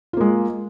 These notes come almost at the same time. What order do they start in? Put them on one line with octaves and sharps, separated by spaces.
F4 A#3 G#3